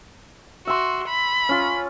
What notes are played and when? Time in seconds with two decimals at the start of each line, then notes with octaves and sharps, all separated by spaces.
0.67 F#4 E5 C6
1.08 B5
1.49 C#4 F4